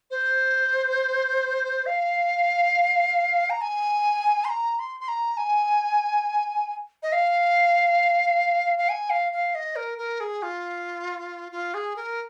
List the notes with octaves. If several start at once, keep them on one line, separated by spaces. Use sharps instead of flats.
C5
F5
A#5
G#5
C6
A#5
C6
C6
A#5
G#5
D#5
F5
F5
G#5
F5
F5
D#5
A#4
A#4
G#4
F4
F4
G#4
A#4